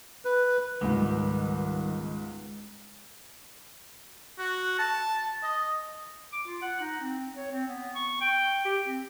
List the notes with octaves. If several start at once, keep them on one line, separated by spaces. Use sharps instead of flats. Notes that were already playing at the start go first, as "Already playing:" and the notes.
B4
C#2 G#2 D#3 G3 B3
F#4
A5
D#5
D6
F4
F#5
D#4
C4
C#5
C4
B3
C#6
G5
G4
C4